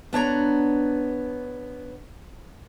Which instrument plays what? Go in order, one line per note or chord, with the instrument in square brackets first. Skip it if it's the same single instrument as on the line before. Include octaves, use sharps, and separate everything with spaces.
[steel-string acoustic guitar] B3 D4 C#5 A#5